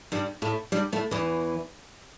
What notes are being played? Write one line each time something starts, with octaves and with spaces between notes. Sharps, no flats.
G2 G3
A2 A3
G2 G3
A2 A3
E2 E3